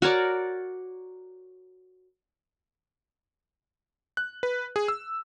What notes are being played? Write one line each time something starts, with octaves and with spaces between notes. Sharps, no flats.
F#4 A#4 C#5 D5
F#6
B4
G#4
E6